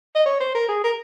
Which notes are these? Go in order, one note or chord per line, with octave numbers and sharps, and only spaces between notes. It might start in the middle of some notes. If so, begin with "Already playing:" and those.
D#5
C#5
C5
A#4
G#4
A#4